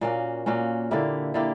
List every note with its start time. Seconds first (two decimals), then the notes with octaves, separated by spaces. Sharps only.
0.01 A#2 A#3 C#4 F#4
0.46 A#2 A#3 C#4 F#4
0.91 D3 A#3 E4 G4
1.34 D3 A#3 E4 G4